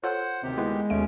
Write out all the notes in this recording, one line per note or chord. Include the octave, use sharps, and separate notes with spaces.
F4 A4 C5 C#5 F#5
D2 C3 D#3 G4
G#3 B3 E4 B4
D#2 B2 A3 C#4 D7